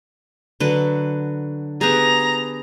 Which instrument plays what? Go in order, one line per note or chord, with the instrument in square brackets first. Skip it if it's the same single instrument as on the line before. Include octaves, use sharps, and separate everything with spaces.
[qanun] D3 F#3 B4
[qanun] B3 G4 G#4 [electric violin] A#5